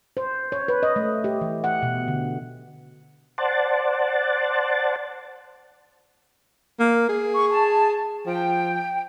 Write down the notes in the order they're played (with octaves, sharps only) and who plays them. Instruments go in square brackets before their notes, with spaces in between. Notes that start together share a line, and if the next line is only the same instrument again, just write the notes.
[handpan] C5
C#5
B4
D#5
A3
G4
E3
F#5
B2
D3
[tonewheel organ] C5 D5 F#5 A5
[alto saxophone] A#3
G#4
[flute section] C#6
A5
[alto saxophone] F3 [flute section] G5